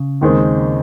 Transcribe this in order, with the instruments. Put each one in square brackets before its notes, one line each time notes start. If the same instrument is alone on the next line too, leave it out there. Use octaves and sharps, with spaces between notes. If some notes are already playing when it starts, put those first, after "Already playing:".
Already playing: [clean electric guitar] C#3
[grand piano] D#2 D#3 G#3 C4